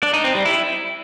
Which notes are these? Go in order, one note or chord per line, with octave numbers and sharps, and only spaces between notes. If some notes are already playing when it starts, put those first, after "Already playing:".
D4
D#4
C4
G3
E4